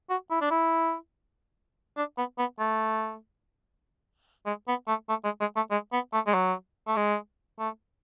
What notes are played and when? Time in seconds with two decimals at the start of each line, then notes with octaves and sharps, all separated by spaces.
0.10 F#4
0.31 E4
0.41 D4
0.51 E4
1.97 D4
2.17 B3
2.38 B3
2.60 A3
4.46 G#3
4.68 B3
4.88 A3
5.09 A3
5.24 G#3
5.41 G#3
5.56 A3
5.71 G#3
5.93 B3
6.13 A3
6.27 G#3
6.34 F#3
6.87 A3
6.96 G#3
7.59 A3